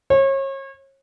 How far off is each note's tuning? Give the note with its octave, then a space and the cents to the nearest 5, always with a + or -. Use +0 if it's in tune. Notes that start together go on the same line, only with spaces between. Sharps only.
C#5 -35